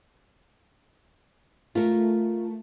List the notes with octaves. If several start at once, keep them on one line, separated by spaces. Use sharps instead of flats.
A3 F4 A#4